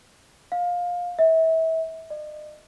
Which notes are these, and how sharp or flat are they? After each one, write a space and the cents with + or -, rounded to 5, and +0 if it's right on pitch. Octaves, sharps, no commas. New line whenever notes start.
F5 +20
E5 -30
D#5 -45